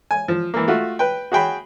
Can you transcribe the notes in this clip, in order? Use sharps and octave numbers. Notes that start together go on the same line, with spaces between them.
G#5
F3
E3 A#3
A3 F4 F#4
B4 G5
F#4 G#4 G5 B5